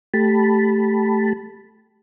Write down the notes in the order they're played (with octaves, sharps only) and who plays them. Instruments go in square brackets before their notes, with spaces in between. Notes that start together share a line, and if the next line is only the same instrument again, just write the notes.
[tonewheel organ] A3 G4 A5 B5